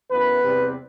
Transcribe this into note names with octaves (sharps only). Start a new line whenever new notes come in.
F#2 E3 B3 B4
E2 C3 G3 C4